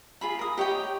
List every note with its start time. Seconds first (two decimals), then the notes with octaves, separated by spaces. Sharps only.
0.21 F4 G#4 B5
0.39 A#4 D#6
0.58 G4 C#5 D#5 G5